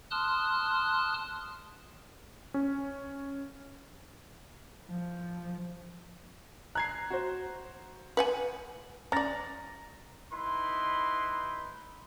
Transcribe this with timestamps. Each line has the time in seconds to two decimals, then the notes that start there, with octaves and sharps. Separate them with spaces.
0.11 A5 C6 D#6 F6 F#6
2.54 C#4
4.89 F3
6.75 A#5 F#6 G#6 C7
7.10 F#4 C5
8.17 B4 F#5 G#5
9.12 C#4 D5 A#5 A6 A#6
10.33 D#4 E4 B4 C6